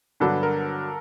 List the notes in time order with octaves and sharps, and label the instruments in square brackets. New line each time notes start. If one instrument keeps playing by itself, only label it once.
[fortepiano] G2 D3 F#3 B3 D4 [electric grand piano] A4
[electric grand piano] A#4